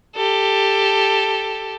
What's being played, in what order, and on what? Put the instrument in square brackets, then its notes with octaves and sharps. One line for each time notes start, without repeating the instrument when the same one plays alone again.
[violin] G4 A4